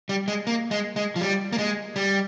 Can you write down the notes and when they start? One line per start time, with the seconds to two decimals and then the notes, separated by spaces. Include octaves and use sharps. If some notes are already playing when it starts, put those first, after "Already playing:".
0.09 G3
0.28 G#3
0.47 A#3
0.71 G#3
0.96 G#3
1.16 F3
1.21 G3
1.53 A#3
1.58 G#3
1.96 G3